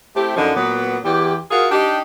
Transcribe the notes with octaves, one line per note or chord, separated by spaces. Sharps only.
A3 C4 E4 G4
F#2 D3 F3 D4 D#4
A#2 F#3 B3
E2 G4
F4 F#4 G#4 A#4
D4 D#4 G4